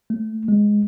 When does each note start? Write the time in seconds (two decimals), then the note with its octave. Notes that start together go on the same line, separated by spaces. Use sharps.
0.10 A3
0.48 G#3